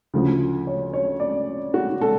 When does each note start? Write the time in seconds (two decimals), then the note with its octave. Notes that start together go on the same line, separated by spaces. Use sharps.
0.14 D2 C#3 F3
0.67 C#5
0.93 C#5
1.20 D5
1.74 F#4
2.01 A4